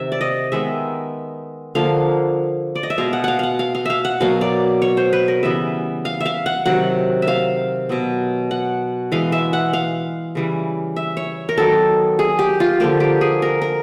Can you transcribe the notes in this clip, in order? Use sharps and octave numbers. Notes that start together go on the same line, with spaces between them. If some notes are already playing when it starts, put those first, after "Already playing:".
Already playing: C3 D#3 E5
D5
D#5
D#3 G#3 B3 E5
D3 F3 A#3 F5
D5
D#5
E5
B2 G#3 B3 F5
F#5
F5 F#5
F5 F#5
F5
F5
E5 F5
F#5
B2 F#3 A#3 F5
D5
C#5
C5
B4
A#4
C#3 E3 G3 B3 E5
F5
E5
F5
F#5
C3 D#3 F#3 F#5
E5
F5
B2 F#3 B3
F#5
E3 G#3 B3 F5
E5
F#5
F5
C#3 E3 G3
E5
C#5
A#4
D#3 F#3 B3 A4
G#4
G4
F4
D3 F3 A#3 G4
G4
G#4
A#4
A#4